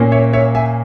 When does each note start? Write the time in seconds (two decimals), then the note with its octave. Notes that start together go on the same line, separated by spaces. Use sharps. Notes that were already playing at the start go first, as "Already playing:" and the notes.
Already playing: A#2 A#3 C#4
0.12 C#5 E5
0.33 C#5 E5
0.55 E5 G#5